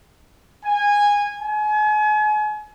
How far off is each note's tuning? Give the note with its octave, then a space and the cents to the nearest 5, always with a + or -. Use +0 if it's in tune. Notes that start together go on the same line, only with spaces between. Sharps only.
G#5 -15
G#5 +35